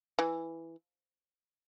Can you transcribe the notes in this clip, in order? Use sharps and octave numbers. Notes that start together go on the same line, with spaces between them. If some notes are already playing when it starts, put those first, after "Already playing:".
E3